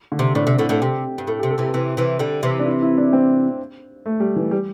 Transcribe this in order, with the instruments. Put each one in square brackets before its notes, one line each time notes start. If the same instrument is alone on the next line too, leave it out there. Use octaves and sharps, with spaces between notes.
[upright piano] D3
[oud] C3
[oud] A2 [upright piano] D4
[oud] C3
A2 D3
[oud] A2 D3 [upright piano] A4
[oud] C3 [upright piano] G4
[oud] G2
[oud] A2 [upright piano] A4
[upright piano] G4
[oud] C3
[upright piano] A4
[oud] C3 E3 [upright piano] G4
[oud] C3 E3
C3 E3
D3 G3
C3 E3
[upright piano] D4
E4
E4
D4
C4
A3
G3
E3
G3